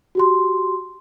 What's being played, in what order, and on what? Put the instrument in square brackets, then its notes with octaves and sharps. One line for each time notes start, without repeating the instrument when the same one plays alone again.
[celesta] F#4 G4 C6